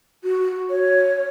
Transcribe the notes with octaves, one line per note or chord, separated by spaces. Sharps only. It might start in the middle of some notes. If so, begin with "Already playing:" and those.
F#4
C#5